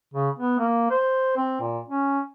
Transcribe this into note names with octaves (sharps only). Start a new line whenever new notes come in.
C#3
B3
A#3
C5
C4
A#2
C#4